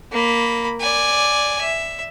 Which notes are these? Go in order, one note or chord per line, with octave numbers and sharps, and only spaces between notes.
A#3 B5
D5 G#5
E5